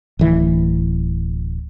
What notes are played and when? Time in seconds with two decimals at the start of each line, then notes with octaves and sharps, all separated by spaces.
0.19 D1 E3